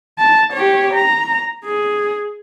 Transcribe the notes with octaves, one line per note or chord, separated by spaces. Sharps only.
A5
G4 C#5
A#5
G#4